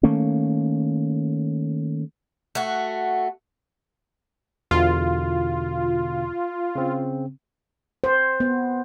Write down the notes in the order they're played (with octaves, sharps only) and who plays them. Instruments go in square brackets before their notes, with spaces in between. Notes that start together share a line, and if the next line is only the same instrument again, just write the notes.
[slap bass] D#3 A3 A#3 C#4
[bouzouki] A3 F#4
[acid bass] E2 [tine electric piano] B2 D3 F6 [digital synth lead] F4
[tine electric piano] C#3 C4
[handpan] C5
B3